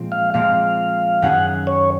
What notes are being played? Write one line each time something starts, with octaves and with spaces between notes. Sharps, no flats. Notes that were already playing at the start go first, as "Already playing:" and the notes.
Already playing: A#2 F3 G#3 C4
F5
A#2 F3 G#3 C4 F5
F#2 D#3 F#3 C#4 G#4 F#5
C#5